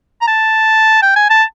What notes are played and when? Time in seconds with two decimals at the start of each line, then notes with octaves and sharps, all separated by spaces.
0.21 A#5
0.27 A5
1.02 G5
1.16 G#5
1.30 A5